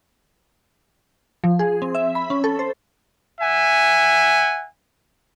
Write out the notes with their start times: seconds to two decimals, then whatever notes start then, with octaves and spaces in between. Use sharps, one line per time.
1.44 F3
1.59 G#4
1.82 C4
1.95 E5
2.15 B5
2.30 C#4
2.44 A4
2.59 C5
3.39 E5 F#5 G#5